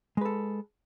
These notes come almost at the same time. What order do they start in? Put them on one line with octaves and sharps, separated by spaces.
G#3 B4 A4